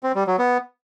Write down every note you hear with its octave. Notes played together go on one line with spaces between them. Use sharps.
C4
G3
F#3
B3